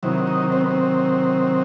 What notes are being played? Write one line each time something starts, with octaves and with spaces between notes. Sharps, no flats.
C3 D#3 F#3 E4
D#4
C4
B3
C4